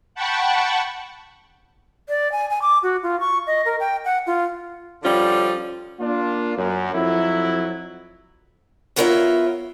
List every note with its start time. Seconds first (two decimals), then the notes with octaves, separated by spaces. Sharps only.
0.15 F#5 G5 A5 B5 C#6
2.09 D5
2.32 G#5
2.50 G#5
2.62 D6
2.83 F#4
3.03 F4
3.20 C#6
3.47 D#5
3.65 A#4
3.80 G5
4.05 F#5
4.27 F4
5.03 D3 F3 G3 C#4 F4
6.00 A#3 D4 F4
6.56 F#2
6.93 F2 F#3 E4
8.96 F#3 B3 F4 A#4 C#5 E5